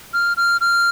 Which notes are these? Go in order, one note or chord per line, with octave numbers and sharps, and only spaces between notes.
F6
F6
F6